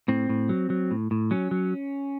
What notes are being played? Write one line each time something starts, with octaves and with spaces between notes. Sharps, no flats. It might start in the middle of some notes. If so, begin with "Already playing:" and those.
A2 C4
A2
F#3
F#3
A2
A2
F#3 C#4
F#3